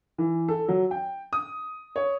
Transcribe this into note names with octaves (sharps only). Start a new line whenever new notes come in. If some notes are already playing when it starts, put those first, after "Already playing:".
E3
A4
F#3
G5
D#6
C#5